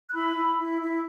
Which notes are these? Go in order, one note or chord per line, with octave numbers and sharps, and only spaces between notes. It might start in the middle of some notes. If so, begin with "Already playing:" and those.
F#6
E4 B5 E6
E4
E4
E4